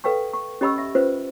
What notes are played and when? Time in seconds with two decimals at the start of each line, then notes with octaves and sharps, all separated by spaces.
0.04 A4 B4 F5 G5 C#6
0.33 C#6
0.61 C#4 G4 D#5 B5 C#6 E6
0.78 E5
0.95 C#4 F4 B4 C5